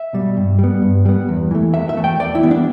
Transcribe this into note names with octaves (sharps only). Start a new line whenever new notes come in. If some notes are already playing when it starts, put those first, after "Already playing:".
Already playing: E5
B2 G3
G2
G3 B3
G2
G3 B3
E2
E3 A3
E2 E5
E5
E3 A3
G5
E2 D5
E4
E3 G3 B3
D4